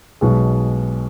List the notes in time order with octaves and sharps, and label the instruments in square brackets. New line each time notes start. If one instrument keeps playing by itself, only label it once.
[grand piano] B1 B2 G#3